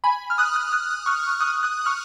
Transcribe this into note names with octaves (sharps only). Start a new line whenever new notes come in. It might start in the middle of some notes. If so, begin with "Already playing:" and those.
G#5 B5
F6
D#6 F#6
D#6 F#6
D#6 F#6
C#6 F6
D#6 F#6
D#6 F#6
C#6 F6